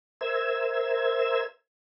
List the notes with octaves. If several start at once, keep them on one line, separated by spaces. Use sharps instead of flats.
A#4 C5 E5 E6 G#6